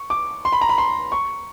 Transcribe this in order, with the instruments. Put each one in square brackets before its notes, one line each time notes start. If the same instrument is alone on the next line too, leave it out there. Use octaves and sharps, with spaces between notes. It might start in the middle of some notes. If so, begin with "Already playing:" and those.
Already playing: [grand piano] C#6
D6
C6
B5
A#5
B5
C6
C#6